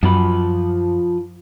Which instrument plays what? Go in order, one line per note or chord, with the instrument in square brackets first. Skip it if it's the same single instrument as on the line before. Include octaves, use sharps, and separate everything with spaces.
[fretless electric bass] F#2 [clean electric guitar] F3 F4 B5